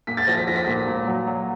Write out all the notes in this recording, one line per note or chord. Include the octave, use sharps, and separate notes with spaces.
A#2 B6
A6
F3 A#6
B6
F3 A#6
B6
A#2 A#6
A#2
F#3
F#3